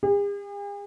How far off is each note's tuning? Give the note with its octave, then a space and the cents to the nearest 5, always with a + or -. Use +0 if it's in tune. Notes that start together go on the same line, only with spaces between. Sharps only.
G#4 -45